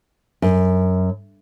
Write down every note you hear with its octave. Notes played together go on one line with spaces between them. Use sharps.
F#2